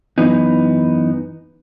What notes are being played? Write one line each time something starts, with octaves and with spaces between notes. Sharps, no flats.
F#2 E3 B3 D#4